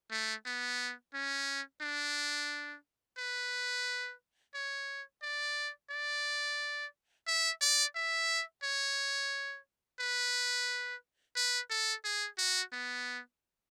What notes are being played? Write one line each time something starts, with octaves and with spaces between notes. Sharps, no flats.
A3
B3
C#4
D4
B4
C#5
D5
D5
E5
D5
E5
C#5
B4
B4
A4
G#4
F#4
B3